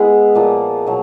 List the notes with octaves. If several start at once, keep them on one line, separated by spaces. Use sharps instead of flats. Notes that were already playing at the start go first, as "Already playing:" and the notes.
Already playing: G#3 B3 E4 G#4
A#2 F3 A#3
B2 F#3